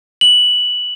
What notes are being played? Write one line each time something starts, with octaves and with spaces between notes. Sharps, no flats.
F#7